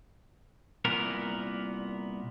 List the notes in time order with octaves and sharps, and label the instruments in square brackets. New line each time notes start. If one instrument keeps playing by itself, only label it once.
[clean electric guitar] C2 A#2 B3 A#4